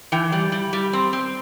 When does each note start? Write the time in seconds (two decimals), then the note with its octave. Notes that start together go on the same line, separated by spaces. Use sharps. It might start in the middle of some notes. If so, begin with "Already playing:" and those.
0.12 E3 G5
0.32 G3
0.52 G3
0.73 G3
0.93 C4
1.13 C4